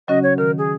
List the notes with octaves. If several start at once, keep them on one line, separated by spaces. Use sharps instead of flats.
C#3 F#3 C#4 F#4 D#5
C#5
D#3 A#4
G#4